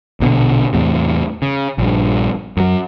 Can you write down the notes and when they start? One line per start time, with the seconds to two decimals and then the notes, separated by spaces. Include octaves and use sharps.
0.20 A#1 B2 D3
0.73 E2 A2 C3
1.42 C#3
1.78 A#1 G2
2.57 F#2 F#3